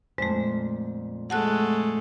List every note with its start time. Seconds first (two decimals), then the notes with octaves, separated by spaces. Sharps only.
0.18 F2 A#2 G#3 A3 C5
1.30 G#3 A3 F#5 A5 F#6